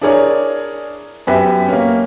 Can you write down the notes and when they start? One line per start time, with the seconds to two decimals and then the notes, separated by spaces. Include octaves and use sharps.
0.01 D4 E4 G#4 A#4 C#5 D5
1.27 F#2 B3 G4 B4 E5 B6
1.68 A#3 C#4